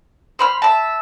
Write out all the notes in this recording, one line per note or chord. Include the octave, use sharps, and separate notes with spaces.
C5 B5 F6
E5 A5